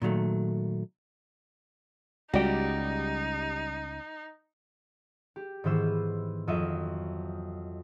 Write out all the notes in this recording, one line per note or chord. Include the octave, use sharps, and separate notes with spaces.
A#2 D#3 F#3 A3
C#2 G3 D#4 F#4 G4 D5
G4
G#2 D#3 E3 B3 C5 E6
F2 F#3 F4 D#5 E5 D#7